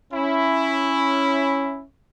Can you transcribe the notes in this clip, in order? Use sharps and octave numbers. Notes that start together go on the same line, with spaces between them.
C#4 E4